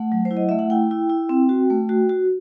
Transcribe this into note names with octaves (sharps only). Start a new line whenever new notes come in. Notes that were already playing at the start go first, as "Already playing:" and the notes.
Already playing: A3 F#5
F#3
C5
E4
D#5
A3 E5
F#5
E4 G5
E4
E4
C4
F#4
A3
F#4
F#4